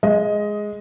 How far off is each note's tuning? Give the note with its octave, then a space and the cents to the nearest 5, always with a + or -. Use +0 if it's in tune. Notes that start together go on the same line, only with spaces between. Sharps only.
G#3 +0 D#5 +15